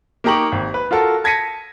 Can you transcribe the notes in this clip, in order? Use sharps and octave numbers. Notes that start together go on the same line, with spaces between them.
A#3 D#4 G4 A#5 C#6 F#7
G#1
B4
F4 F#4 A4 A#4
A5 G#6 A#6 B6 C#7 D#7